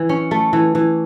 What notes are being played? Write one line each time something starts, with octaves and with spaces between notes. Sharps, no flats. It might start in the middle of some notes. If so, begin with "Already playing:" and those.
Already playing: E3
C#4
A3
E3
E3